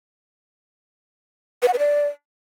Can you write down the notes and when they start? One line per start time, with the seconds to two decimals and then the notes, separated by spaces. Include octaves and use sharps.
1.63 B4
1.68 F#5
1.73 B4
1.79 D5